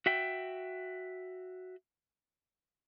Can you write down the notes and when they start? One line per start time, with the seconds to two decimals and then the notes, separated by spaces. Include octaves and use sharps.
0.06 F#4 E5 G5